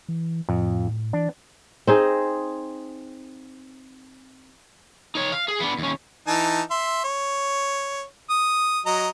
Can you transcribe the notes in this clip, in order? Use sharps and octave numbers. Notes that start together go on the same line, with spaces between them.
E3
F2 A2
E3 D4
C4 D#4 G#4
D#4 C#5
F5
G#4
B3 D4
D#2 C#4
E3 D#4 A5
E5 C6
C#5
D#6
F#3 D#5 A#5